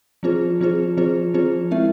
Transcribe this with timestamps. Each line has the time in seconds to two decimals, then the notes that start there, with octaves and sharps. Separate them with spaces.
0.23 F3 C4 F4 G#4 C5
0.61 F3 C4 F4 G#4 C5
0.97 F3 C4 F4 G#4 C5
1.34 F3 C4 F4 G#4 C5
1.71 G#3 C4 E4 A#4 E5